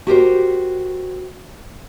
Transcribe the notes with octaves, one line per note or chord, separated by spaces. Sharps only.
F#4 G4 A#4 C5